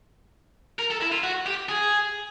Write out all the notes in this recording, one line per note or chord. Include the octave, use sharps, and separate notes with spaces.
A#4
A4
E4
F4
F#4
G4
G#4